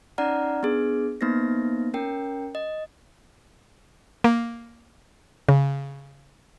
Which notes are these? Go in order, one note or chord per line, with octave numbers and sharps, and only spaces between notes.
C#4 D#4 D5 F#5 A#5 F6
B3 D4 G#4
A#3 B3 D#4 C5 A#6
C#4 A#4 G5
D#5
A#3
C#3